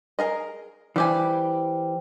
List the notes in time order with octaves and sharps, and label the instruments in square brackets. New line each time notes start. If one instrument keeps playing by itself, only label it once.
[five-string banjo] G#4 A#4 D#5
[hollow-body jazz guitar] E3 [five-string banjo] G3 G4 G#5 [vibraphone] C5 G5